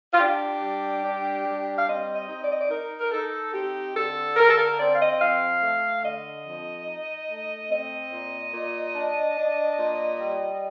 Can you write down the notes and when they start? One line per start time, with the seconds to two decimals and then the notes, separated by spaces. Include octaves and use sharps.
0.12 F4
0.19 D4 G4
0.62 G3
1.03 D4
1.45 G3
1.76 F5
1.87 C4 D#5
2.14 D#5
2.28 D#4
2.43 D5
2.50 D#5
2.59 D5
2.70 D#4 A#4
3.00 A#4
3.12 D#4 A4
3.53 C4 G4
3.95 D3 A4
4.37 D3 A#4
4.49 A4
4.57 A#4
4.78 C4 D5
4.95 F5
4.99 D#5
5.19 F2 F5
5.62 A3
6.03 D3 D#5
6.46 F2
6.86 D#4
7.29 A3
7.70 C4 D#5
8.11 A#2
8.54 A#2
8.95 D4
9.37 D4
9.78 A#2
10.20 G3